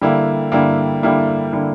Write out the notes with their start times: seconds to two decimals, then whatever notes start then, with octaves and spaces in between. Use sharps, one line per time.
0.01 D3 G3 A#3 E4
0.52 D3 G3 A#3 E4
1.03 D3 G3 A#3 E4
1.53 D3 G3 A#3 E4